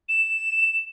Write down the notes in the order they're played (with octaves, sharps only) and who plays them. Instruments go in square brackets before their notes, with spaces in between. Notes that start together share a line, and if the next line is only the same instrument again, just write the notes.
[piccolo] E7